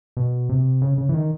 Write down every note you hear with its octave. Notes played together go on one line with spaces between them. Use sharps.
B2
C3
C#3
C#3
E3
D#3